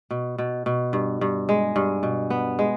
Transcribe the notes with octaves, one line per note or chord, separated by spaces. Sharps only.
B2
B2
B2
G2
G2
G#3
G2
B2
B3
G#3